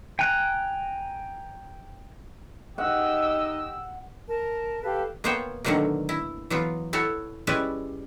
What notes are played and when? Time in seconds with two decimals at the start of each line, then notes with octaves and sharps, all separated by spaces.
0.19 G5 G#5 A#5 F#6
2.78 D#4 G4 D#5 F#5 E6
4.28 A#4 A5
4.83 G4 A4 B4 F5
5.24 A#3 B3 F4 C5 C#5 G5
5.64 B2 D3 D#3 F#3 A3 A#3
6.09 E4
6.50 E3 F#3 B3 F4
6.93 E4 F#4 A4 C#5
7.47 G3 G#3 C#4 E4 B4 D5